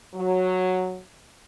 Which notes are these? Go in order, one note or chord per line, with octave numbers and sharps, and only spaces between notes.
F#3